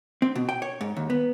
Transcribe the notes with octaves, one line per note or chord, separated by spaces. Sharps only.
C4
B2
G5
C#5
G#2
D#2
B3